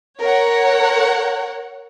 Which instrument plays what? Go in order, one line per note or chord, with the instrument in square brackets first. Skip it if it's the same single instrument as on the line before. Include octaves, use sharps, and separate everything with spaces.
[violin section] A#4 C#5 F#5